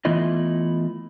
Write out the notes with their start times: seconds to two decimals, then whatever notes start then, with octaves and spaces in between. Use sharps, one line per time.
0.05 E3 A3 B3 E4 F4 D#5